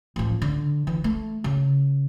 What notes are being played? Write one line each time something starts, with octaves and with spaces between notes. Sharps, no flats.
A1 F3
D3
E3
A3
C#3